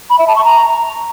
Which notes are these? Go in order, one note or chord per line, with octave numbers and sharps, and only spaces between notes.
B5
E5
A5
C#6
A#5